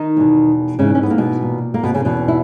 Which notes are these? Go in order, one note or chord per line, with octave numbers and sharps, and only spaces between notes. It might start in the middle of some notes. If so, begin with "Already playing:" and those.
Already playing: D#3 D#4
E2 B2
G#2 C#3 E3 C#4
C#4
B3
A#3
B2 B3
A#2
A#3
B2 B3
C#3 C#4
E2 B2
E4